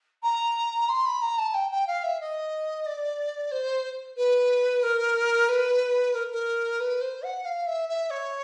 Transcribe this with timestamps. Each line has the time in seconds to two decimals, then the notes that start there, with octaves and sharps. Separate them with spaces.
0.23 A#5
0.89 C6
1.06 B5
1.22 A#5
1.38 A5
1.54 G5
1.71 G5
1.87 F5
2.03 E5
2.21 D#5
2.86 D5
3.51 C5
4.17 B4
4.83 A#4
5.49 B4
6.14 A#4
6.32 A#4
6.80 B4
7.01 C5
7.23 F#5
7.45 F5
7.67 E5
7.89 E5
8.10 C#5